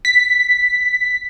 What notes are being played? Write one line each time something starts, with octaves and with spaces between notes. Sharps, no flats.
B6